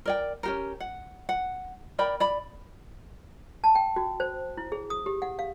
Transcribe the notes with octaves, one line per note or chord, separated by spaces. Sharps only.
A#4 D5 G5
C#4 G4 A#4
F#5
F#5
A#4 D5 G5 B5
D5 B5
A5
G5
F#4
C5
E4
G#4
D#6
G4
F#5
F5